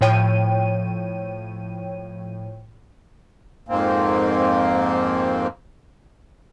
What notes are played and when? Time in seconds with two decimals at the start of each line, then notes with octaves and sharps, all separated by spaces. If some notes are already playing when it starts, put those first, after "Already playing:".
0.01 A2 F3 C#5 G5 D#7
3.68 F2 G#2 A#3 C4